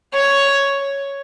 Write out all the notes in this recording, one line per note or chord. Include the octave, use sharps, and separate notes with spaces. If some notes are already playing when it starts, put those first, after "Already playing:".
C#5